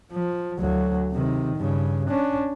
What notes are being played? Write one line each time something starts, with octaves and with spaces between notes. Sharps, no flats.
F3
D2 F#3
C3 D#3
G2 C#3
C#4 D4